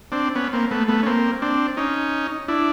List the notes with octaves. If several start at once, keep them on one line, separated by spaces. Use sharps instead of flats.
C4 D4
B3 C#4
A#3 C4
A3 B3
A3 B3
C#4
A#3 C4
C4 D4
C#4 D#4
D4 E4